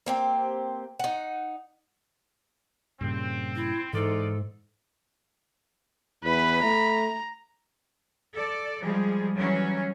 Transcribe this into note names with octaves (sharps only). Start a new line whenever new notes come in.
A#3 C4 G4
D#4 F#5
G2 A#2 C#3 C4
E4
G#2 E3 D#4 F4 A4 D5
E2 B4 B5
A3 A#5
A4 D5
F3 G3 G#3 G#4
E3 F#3 G3 C#4 C#5